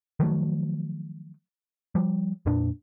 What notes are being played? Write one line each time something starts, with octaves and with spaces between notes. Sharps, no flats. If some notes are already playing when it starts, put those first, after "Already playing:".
D#3 F3 F#3 A3
F3 G3
F2 A#2 D4